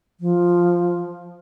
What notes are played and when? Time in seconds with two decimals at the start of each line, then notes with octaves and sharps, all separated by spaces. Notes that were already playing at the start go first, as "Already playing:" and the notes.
0.20 F3